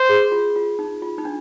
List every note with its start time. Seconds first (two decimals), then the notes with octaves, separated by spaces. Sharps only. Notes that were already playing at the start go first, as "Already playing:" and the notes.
Already playing: C5
0.09 G#4
0.32 F4
0.56 F4
0.79 D#4
1.02 F4
1.18 D#4
1.25 D4